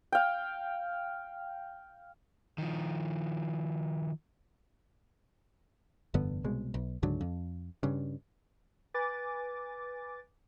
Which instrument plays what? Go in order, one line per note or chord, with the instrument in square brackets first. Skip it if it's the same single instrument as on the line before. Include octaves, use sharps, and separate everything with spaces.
[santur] F5 G5
[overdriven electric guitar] D#3 F3
[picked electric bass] F1 G2 D3 B3
C2 B2 G#3
B1
C#2 G#2 D3 F#3
F2
G2 C#3
[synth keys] B4 G#5 D6 A6